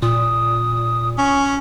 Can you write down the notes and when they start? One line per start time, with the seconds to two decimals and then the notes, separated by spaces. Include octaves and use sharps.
0.02 A#2 D#6
1.18 C#4 C#6